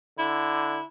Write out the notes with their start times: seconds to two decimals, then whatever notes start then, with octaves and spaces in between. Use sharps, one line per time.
0.18 D3 E4